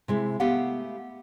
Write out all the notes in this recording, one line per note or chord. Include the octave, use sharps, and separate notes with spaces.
C3 G#3 E4
A3 B3 G4 F5 F#5